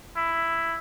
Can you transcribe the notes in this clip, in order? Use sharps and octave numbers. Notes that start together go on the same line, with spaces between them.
E4